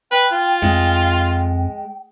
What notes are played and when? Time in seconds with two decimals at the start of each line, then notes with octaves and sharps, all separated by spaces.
0.11 B4 G5
0.32 F4
0.62 F2 G#3